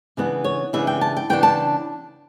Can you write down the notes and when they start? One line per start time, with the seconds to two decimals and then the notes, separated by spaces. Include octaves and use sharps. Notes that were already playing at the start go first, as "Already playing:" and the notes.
0.17 C#3 E3 B3 D4
0.44 C#5
0.73 C#3 E3 B3 D4 E5
0.87 G5
1.01 A5
1.16 G5
1.29 C#3 E3 B3 D4 G5
1.43 A5